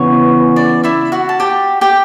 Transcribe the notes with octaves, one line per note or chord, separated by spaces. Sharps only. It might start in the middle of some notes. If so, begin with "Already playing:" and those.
Already playing: C#3 E3 B3 C#5
D5
E4 E5
F#4 F#5
A5
G4 G5
G4 G5